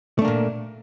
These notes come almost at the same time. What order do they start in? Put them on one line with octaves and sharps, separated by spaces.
A3 D4 A#3 A#2